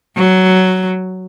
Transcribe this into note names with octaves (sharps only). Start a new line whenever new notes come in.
F#3